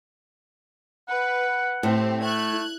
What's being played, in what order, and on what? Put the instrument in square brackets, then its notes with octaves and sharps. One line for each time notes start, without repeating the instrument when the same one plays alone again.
[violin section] B4 [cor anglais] F#5
[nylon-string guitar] A2 [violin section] C4 G4
[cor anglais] A3 [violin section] F#6 G#6